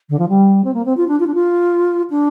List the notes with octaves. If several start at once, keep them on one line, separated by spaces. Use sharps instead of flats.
D3
F3
G3
C4
A#3
C4
F4
D4
F4
D4
F4
D4